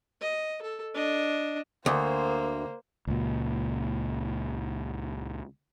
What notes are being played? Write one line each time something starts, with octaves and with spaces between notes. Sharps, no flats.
D#5
A4
D4 D#5
D2 A#3 C5
C#2 A#2